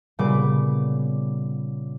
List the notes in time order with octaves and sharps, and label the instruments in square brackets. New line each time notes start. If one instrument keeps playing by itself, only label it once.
[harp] A#2 C#3 G3 B3 D6